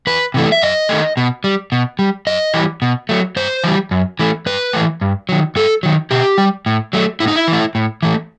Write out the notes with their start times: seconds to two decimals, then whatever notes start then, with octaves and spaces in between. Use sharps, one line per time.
0.07 E2 B4
0.34 C3 E3 A3
0.52 E5
0.62 F#2 D#5
0.89 D#3 A3
1.17 B2
1.44 G3
1.72 B2
1.99 G3
2.27 F#2 D#5
2.54 E3 G3
2.82 B2
3.09 F#3 A3
3.36 G2 C5
3.64 E3 G3
3.91 F#2
4.19 E3 A3
4.46 G2 B4
4.73 E3 A3
5.01 G2
5.29 D#3 F#3
5.56 G2 A4
5.83 D#3 F#3
6.11 B2 G4
6.38 G3
6.66 A2
6.93 F#3 A3
7.20 A2 E4
7.28 D#4
7.36 E4
7.48 E3 A3
7.75 A2
8.03 E3 A3